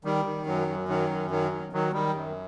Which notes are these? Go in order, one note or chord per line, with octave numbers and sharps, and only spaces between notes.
D#3 G3
D#3
F#2 F#3
F#2
D#3 F#3
F#2
D#3 F#3
D#3
D#3 F#3
D#3 G3
F#2